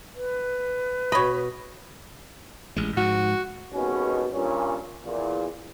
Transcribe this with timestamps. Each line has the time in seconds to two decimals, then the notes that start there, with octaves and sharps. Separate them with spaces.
0.15 B4
1.12 B2 C#5 D#5 B5
2.77 A1 G#3
2.97 G#2 F3 F#4
3.74 G#1 D#2 B2 G#3 B3 C#4
4.33 G2 A#2 C#4
5.05 E2 A#2